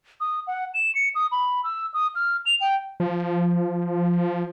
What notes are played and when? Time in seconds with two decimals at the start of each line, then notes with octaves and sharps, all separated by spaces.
0.20 D#6
0.47 F#5
0.74 E7
0.95 C#7
1.15 D#6
1.32 B5
1.64 E6
1.94 D#6
2.15 F6
2.46 F7
2.61 G5
3.00 F3